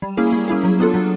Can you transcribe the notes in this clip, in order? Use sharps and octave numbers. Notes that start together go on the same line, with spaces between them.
G3
A#3 C#4 E4 G#4
G3
A#3 C#4 E4 G#4
F#3
B3 D4 F4 A4
F#3